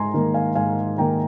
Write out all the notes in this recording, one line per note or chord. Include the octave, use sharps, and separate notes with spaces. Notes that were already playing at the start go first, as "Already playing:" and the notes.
Already playing: G#2 G#5 A#5 C6
D#3 A#3
F5 G#5
G#2 F5 G#5
D#3 A#3 G5 A#5